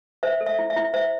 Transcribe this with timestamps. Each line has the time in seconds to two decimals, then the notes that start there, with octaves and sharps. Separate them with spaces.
0.23 C5 E5
0.41 A4
0.46 E5
0.59 E4
0.70 E5
0.76 E4
0.94 C5 E5